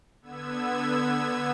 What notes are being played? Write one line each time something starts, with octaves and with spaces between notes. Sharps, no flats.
D3 B3 E6 G#6